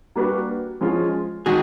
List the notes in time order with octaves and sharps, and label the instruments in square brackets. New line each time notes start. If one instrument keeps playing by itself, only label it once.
[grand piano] G3 A#3 D4 F#4 B4
F3 G#3 C#4 F4 G#4
[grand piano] D#3 G#3 [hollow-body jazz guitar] F#4 G#4